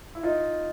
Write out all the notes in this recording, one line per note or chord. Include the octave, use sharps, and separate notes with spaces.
E4
D#4 F4